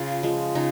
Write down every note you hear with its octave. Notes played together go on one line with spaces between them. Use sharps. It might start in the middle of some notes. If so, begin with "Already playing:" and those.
Already playing: C#3 F4
F3 G#3
C#3 D#4